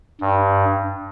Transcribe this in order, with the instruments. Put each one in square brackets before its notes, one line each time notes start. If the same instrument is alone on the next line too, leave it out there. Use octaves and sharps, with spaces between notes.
[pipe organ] G2